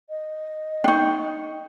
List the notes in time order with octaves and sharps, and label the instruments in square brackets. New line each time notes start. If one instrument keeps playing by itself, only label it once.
[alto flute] D#5
[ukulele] D4 D#4 [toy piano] G5 C#6